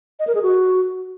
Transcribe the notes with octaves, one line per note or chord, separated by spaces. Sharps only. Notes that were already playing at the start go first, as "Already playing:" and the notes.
D#5
A#4
G#4
F#4